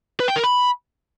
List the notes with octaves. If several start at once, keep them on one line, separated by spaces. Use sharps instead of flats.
B4
G5
A#4
B5